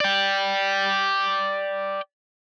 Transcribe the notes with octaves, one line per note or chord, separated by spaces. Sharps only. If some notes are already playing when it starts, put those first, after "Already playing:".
D5 G5